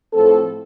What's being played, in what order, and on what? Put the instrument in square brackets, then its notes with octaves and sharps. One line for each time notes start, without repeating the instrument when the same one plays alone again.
[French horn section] A2 F3 A3 C4 A4